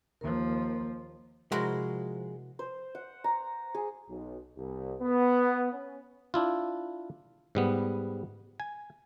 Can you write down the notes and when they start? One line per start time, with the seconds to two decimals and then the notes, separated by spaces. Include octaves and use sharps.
0.21 D#2 F3 A#3 A#4
1.52 C3 F3 G#3 E4 F#4 A#4 C6
2.59 C5
2.95 F#5
3.24 A#5
3.75 G#4
4.08 B1
4.56 C2
5.01 B3
5.72 C#4
6.34 D4 E4 F4
7.55 G#2 G3 B3
8.60 G#5